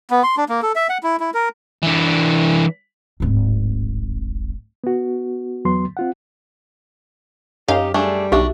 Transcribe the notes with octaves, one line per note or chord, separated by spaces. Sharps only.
B3
C6
D4
A#3
A4
E5
F#5
E4
E4
A#4
E3 D4
D1 G#1
B3 F#4
E2 F#3 B3 C6
C4 F4 F#5
F#2 C#4 D#4 G4 F5
G3 A3 D4 G#4
B1 D4 F#4 G4 E5